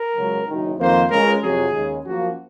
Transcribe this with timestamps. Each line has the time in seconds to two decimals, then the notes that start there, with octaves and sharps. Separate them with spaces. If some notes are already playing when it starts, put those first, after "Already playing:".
Already playing: A#4
0.15 C#2 C#3 F#3
0.47 F#1 F#2 D#3
0.78 F2 D#3 A#3 C5
1.10 C#2 C#3 G#3 A#4
1.41 F2 C3 F#3 G#4
1.72 D#2 C#3 G#3
2.04 F#2 F3 A#3 F#4